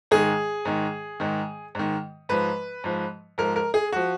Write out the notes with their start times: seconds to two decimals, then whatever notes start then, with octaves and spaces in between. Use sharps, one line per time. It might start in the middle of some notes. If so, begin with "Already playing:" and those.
0.11 G#2 D#3 G#4
0.65 G#2 D#3
1.20 G#2 D#3
1.75 G#2 D#3
2.29 G#2 F3 B4
2.84 G#2 F3
3.38 G#2 F3 A#4
3.56 A#4
3.74 G#4
3.92 F3 F#4